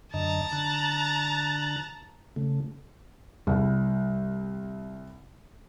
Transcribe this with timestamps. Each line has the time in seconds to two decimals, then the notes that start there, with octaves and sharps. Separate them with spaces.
0.14 F#2 D3 D#5 A5 A#5
0.53 D3 F#6 A6
2.36 C#3 A3
3.47 C2 G3